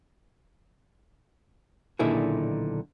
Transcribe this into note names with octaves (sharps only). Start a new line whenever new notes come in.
B1 A#2 D3 D#3 E4 G#4